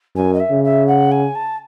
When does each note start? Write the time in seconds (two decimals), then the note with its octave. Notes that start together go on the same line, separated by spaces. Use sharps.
0.15 F#2 G#5
0.33 D#5
0.40 E5
0.51 C#3
0.64 E5
0.87 F#5
1.11 G#5
1.35 A5